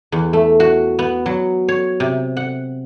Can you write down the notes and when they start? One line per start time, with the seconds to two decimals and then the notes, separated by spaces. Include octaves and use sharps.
0.12 E2
0.33 A3
0.60 F#4
0.99 B3
1.26 F#3
1.68 C#5
2.00 C3
2.37 F#5